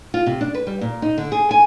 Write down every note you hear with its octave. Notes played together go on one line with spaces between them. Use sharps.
F4
C3
D4
B4
G3
A#2
D#4
D3
G#4
G#5